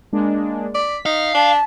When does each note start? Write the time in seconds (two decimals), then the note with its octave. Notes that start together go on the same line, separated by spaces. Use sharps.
0.13 G#3 A#3 D4
0.75 D5 B6
1.06 D#4 F5
1.35 D4 A5